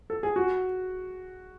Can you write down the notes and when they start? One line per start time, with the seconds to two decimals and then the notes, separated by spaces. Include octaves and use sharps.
0.10 A4
0.23 G#4
0.36 F#4